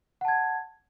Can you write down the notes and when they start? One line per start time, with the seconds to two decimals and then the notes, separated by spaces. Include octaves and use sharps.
0.21 F#5
0.25 A5
0.28 G#6